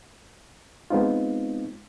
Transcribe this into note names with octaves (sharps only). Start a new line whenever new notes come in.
G#3 B3 C4 D#4 F4